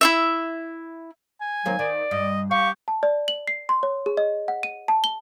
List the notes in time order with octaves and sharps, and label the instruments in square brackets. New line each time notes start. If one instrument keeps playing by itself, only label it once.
[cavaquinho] E4 F4 E5
[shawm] G#5
[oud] D#2 A#3 C4 [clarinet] F#3
[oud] D#3 [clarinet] D5
[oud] G2 [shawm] D#5
[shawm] G4 [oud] F5 [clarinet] C#6
[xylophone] A5
D5
F#7
C7
C6
C#5
G#4
D#5
F#5
D#7
A5
G7